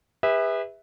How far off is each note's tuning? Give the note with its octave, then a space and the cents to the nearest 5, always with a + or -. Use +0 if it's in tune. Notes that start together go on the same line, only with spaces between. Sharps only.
G#4 -45 B4 +0 E5 -20